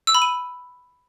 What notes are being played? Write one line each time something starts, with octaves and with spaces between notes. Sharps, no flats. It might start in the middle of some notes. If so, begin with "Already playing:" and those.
E6
B5
D#7